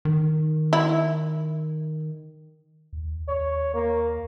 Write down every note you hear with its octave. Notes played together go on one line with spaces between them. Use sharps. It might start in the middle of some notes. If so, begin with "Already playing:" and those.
D#3
E4
D#2
D#2 C#5
A#3